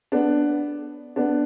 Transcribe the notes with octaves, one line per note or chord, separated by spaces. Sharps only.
B3 D4
B3 D4